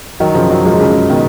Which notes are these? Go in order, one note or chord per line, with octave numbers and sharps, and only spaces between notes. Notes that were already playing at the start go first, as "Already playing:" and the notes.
D#3 F#3
C#3 F3
D#3 F#3
F3 G#3
C#3 F3
B2 D#3